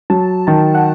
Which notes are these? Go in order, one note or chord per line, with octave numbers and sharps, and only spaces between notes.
F#3 A5
D#3 A5
F#5